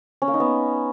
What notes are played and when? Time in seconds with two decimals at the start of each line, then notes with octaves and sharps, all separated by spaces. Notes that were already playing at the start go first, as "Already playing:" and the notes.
0.22 C#4
0.28 A#3
0.34 D#4
0.40 B3